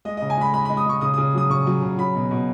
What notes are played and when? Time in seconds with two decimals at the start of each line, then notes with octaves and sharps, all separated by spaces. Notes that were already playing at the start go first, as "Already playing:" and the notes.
0.05 G#3 D#5
0.17 C#3 D#5
0.30 G#5
0.37 G#3 B5
0.53 G#3 B5
0.65 G#3 B5
0.77 D#6
0.86 G#3 C#6
1.01 C#3 D#6
1.14 C#3 D#6
1.34 F#3 D#6
1.49 C#3 C#6
1.67 F#3
1.82 C#3
1.98 F#3 B5
2.15 B2
2.31 B2